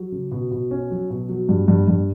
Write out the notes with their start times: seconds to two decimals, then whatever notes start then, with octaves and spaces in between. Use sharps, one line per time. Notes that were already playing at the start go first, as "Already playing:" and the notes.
Already playing: F#3
0.12 C#3
0.31 B2
0.51 B2
0.71 C#4
0.91 F#3
1.10 B2
1.29 F#3
1.49 G2
1.68 G2
1.88 G2